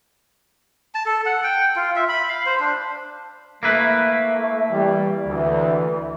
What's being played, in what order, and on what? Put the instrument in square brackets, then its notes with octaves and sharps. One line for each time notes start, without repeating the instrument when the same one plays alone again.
[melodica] A5
A4
F#5
G5
F4
E5
B5
F5
C5
D4
[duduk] A3 [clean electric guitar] A#3 E4 B4
[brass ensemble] E3 G3
[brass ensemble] D2 [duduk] E3